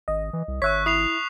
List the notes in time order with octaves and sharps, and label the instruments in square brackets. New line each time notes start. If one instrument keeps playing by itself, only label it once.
[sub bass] G#1 [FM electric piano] D#5
[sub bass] E3
C2
[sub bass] G#1 [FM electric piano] C#5 E5 [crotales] C#6 F#6 B6
[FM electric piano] E4 [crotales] D#6 C7 F7